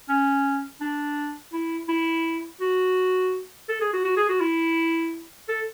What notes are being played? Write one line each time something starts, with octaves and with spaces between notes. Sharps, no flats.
C#4
D4
E4
E4
F#4
A4
G#4
F#4
F#4
G#4
F#4
E4
A4